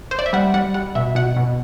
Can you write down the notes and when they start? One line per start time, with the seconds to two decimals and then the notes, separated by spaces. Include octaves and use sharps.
0.11 C5
0.19 D5
0.26 E5
0.33 G3 F#5
0.54 G3 F#5
0.74 G3 F#5
0.95 B2 E5
1.15 B2 F#5
1.36 B2